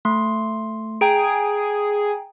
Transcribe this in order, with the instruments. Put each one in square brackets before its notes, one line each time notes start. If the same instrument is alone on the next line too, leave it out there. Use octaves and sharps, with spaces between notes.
[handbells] A3 C6
[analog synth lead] G#4 [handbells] G5 A#5 D7